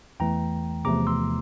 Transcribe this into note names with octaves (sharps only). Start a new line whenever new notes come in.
E2 E3 A3 G5 A#5
E2 C3 F3 A3 A#5 D6
C6 E6